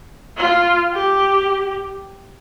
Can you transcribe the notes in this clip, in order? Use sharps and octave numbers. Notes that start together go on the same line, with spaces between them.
F4
G4